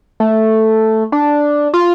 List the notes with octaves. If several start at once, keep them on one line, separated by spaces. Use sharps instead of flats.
A3
D4
F4